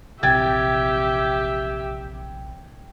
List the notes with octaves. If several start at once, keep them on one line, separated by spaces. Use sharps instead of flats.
A#1 C3 E3 G4 E5 G5 G#6 A6